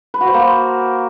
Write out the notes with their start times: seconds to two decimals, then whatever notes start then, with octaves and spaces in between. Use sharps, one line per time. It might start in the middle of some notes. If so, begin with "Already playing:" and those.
0.14 B4
0.21 F#4
0.27 C5
0.34 A#3
0.41 C5